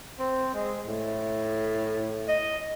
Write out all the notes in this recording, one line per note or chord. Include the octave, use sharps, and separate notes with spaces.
C4
G#3
A2
D#5